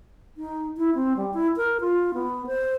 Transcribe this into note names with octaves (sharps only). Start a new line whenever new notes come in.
D#4
E4
C4
G3
E4
A#4
F4
B3
C5